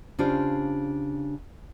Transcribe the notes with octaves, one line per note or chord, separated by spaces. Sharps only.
C#3 D4 F4 G4 C5